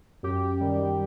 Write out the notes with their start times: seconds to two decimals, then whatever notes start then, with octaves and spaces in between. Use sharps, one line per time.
0.23 F#2 G4
0.60 D#3 G3